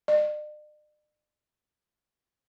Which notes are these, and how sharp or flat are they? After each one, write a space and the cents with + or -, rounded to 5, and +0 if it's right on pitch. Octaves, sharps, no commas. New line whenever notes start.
D5 +45